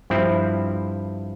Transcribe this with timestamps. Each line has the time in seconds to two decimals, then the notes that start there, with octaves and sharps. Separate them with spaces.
0.10 G2 F3 C4 E4